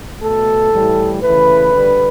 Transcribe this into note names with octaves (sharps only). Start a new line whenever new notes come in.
B2 A3 A4
A2 E3 G3
C#3 E3 A3 B4
D3 G3